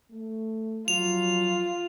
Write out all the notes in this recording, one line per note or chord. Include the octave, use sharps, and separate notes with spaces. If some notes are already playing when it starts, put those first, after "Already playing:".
A3
F3 F#3 F4 F7